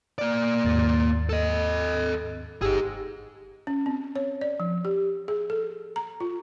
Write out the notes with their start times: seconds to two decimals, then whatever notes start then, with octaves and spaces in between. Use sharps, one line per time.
0.18 A#3 D5
0.65 D#2 G#2 A6
1.29 A4 D#5
2.61 G1 D#4 G4 G#4 E6
3.67 C#4
3.86 C4
4.16 C#5
4.41 D5
4.60 F3
4.85 G4
5.28 G#4
5.50 A4
5.96 A#5
6.20 F4